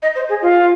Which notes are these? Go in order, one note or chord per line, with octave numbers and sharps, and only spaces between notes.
D#5
C5
G#4
F4